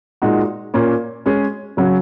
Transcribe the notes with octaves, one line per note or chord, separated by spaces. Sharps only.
A#2 G#3 D#4 F#4
A#2 A#3 C#4
G#3 C#4 G#4
C#3 F#3 C#4 F#4